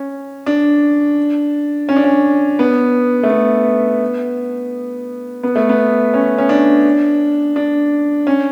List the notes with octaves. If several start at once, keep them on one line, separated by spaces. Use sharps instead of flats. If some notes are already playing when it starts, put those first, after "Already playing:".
Already playing: C#4
D4
C#4
D4
C#4
B3
A3
B3
B3
A3
B3
C#4
C#4
D4
D4
C#4